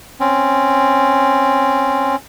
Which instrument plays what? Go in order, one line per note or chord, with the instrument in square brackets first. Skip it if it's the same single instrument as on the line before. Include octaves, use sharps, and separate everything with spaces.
[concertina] C4 C#4